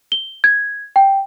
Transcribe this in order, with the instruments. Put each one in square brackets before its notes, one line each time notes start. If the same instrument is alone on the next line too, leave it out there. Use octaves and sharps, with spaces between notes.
[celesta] G7
G#6
G5